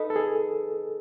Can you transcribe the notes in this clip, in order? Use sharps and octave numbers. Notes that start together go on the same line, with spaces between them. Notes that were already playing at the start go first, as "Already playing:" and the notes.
Already playing: D#4 A4 B4 D#5
A4
G#4